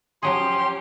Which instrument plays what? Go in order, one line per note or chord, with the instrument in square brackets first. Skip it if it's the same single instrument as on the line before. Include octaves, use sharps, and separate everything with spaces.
[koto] F3 F#3 G#4 [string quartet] C#4 G4 [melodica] C6